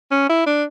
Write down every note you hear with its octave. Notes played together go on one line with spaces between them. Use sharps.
C#4
E4
D4